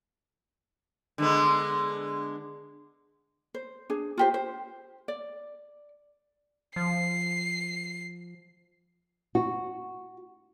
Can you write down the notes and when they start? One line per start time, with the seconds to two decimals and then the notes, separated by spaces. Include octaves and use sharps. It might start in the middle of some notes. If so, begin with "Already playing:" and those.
1.18 D3 G#3 B3
3.54 C5
3.90 D4 G#4
4.18 F4 G4 C5
4.34 C5
5.08 D5
6.76 F3 C7
9.35 F#4